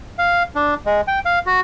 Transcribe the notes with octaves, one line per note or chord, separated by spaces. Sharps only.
F5
D4
G#3
G5
F5
F#4